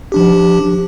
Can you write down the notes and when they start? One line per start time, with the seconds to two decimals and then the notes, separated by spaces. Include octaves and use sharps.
0.12 F3 D4 G4